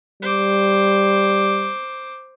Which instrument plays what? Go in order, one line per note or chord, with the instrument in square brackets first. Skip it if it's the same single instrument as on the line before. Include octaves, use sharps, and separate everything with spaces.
[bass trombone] G3 [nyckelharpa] C5 D6